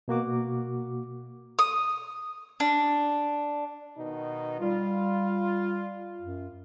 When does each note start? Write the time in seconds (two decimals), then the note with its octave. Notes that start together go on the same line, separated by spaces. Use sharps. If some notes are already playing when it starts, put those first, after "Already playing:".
0.08 B2 A#3 F#4 D6
1.59 D#6
2.60 D4
3.98 B2 D#3 D#4
4.60 G3 F4
6.21 F#2